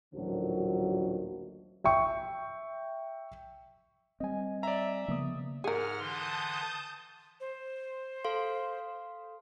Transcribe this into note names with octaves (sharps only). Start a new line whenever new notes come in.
A1 D2 A#2 D#3 F3 F#3
E5 G5 C#6
G3 C4 D#5 G#5
D5 E5 A#5
C#3 F3 A#3 B3 D#6
G#2 G#4 A#4 F#5 F6
D3 E3 A5 C6 D#6 G6
C5
A4 F5 C6